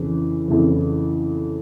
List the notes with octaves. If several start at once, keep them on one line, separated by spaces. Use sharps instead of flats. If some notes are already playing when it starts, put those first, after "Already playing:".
Already playing: F2 C#3 E3
F2 C#3 E3